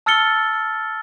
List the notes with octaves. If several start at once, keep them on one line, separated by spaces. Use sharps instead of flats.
A5 E6 F6 A6 C#7 G7